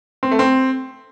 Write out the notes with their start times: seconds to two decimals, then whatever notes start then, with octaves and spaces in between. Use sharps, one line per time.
0.23 C4
0.31 A3
0.39 C4